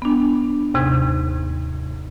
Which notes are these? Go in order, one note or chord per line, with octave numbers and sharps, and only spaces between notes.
B3 D4
D#2 G#2 C3 G#6